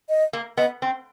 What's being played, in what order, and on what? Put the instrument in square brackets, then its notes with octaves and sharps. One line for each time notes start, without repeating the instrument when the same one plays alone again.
[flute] D#5
[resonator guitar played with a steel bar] A#3
[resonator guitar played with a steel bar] B3 [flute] D#5
[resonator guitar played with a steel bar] C4